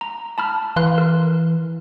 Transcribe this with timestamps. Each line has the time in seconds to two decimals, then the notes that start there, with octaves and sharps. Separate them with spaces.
0.01 A#5
0.38 A5 B5 F6
0.76 E3 F5 C6 F#6
0.98 A#4